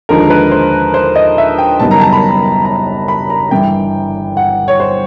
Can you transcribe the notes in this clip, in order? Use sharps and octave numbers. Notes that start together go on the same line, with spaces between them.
D#2 D3 F3 G#3 A#4
B4
C5
C5
D#5
E5
G5
F#1 F#2 D#3 G3 B3 A5
A#5
A5
B5
A#5
B5
A#5
G1 G2 E3 G5
F#5
C#5
C5